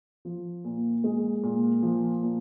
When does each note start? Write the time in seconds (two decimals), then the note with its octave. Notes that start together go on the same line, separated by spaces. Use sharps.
0.25 F3
0.65 A#2
1.04 G#3
1.44 A#2
1.83 F3
2.23 A#2